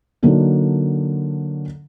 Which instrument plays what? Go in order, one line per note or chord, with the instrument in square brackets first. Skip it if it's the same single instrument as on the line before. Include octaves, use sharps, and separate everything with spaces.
[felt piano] D3 F#3 A#3 D4 D#4